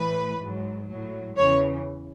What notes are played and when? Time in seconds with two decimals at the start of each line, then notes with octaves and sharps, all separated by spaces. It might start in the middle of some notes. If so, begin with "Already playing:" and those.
Already playing: A2 E3 B4
0.39 G#2 F#3
0.88 A2 F#3
1.37 E2 C#3 E3 C#5